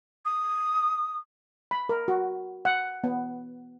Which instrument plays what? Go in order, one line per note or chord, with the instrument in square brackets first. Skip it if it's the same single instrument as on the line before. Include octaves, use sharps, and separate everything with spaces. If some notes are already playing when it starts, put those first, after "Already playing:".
[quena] D#6
[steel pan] B5
A#4
F#4
F#5
B3